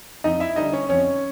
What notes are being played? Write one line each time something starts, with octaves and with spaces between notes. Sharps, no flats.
F2 D#4 D#5
E4 E5
D3 G3 D#4 D#5
C#4 C#5
F2 C#4 C#5